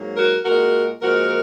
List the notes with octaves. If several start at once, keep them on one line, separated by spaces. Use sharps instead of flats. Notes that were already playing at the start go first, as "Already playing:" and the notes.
Already playing: G#2 F#3 A#3
F#4 A#4
A#2 G#3 F#4 A#4
A#2 F3 G#3 F#4 A#4